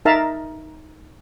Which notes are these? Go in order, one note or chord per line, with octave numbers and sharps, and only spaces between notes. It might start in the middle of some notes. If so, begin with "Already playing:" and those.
D#4 A#4 E5 F5 A5 A#5